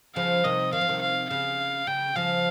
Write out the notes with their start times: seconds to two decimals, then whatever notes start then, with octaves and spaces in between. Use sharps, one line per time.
0.16 C#3 F3 F5
0.44 C3 D#3 D#5
0.73 D#3 F5
0.81 F3
0.88 C3 D#3
1.02 F5
1.30 C#3 F5
1.87 C#3 G5
2.15 C#3 F3 F5